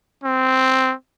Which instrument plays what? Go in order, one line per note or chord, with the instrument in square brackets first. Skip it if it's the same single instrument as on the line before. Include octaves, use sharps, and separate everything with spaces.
[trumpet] C4